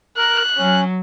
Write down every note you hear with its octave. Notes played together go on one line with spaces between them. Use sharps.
A#4 F#6
F#3 C#4